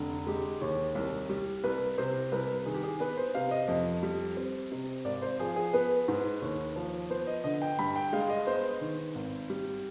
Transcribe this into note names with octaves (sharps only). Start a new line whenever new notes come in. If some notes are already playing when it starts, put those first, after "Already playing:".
Already playing: F1 D3
G#3 G4
D#2
C2
G3
C2 B4
C3 C5
C2 B4
D#3 G#4
G4
G#4
B3 B4
C5
C3 F5
D#5
F2
G3
C4
C3
G#1 D5
C5
F3 G#4
G#4
B3 B4
G#2
D#2
F3
B3 C5
D#5
D3 D#5
G5
G2 B5
G5
G#3 F5
D#5
B3 C5
D#3
G#1
G3